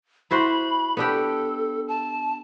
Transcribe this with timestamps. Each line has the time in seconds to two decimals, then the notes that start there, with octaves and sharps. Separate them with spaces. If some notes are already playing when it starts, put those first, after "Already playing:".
0.31 E4 F#4 C5 B5
0.97 B3 D4 G4 A4
1.88 A5